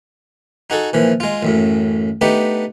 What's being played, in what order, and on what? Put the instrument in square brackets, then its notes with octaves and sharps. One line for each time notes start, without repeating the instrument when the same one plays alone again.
[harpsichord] D#4 F#4 G#4 A4
A#2 E3 F3
G#3 F4
A1 F#2 A2
A3 B3 D4 D#4 G4